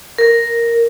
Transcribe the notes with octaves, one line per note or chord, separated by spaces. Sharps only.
A#4